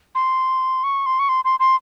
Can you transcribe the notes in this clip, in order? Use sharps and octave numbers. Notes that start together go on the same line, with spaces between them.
C6
C#6
C6
C#6
C6
C6
C6